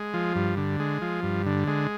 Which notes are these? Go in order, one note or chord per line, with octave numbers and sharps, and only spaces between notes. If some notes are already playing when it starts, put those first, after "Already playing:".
Already playing: G#3
F3
G2
D3
G#3
F3
G2
D3
G#3